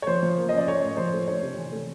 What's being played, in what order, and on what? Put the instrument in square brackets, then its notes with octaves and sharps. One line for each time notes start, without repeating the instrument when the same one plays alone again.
[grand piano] C#5
F3 C5
F3
A#3
C#4 D#5
D5
C#4 C#5
A2
F3 C5
A3
D4 C#5
C3
E3
A3